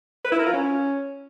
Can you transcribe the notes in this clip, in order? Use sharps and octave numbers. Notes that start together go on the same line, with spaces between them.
B4
E4
A#4
F4
C#4